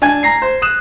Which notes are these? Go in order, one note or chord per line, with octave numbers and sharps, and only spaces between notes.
D4 G#5 G#6
A#5 A#6 C7
C5
D#6 F#6 E7